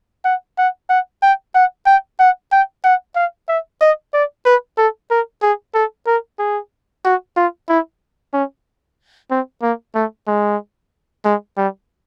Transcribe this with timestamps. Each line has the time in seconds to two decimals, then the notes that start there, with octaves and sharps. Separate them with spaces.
0.25 F#5
0.58 F#5
0.89 F#5
1.23 G5
1.55 F#5
1.86 G5
2.20 F#5
2.52 G5
2.84 F#5
3.15 F5
3.48 E5
3.81 D#5
4.14 D5
4.45 B4
4.78 A4
5.11 A#4
5.42 G#4
5.74 A4
6.07 A#4
6.39 G#4
7.05 F#4
7.37 F4
7.69 E4
8.33 C#4
9.30 C4
9.62 A#3
9.95 A3
10.27 G#3
11.25 G#3
11.57 G3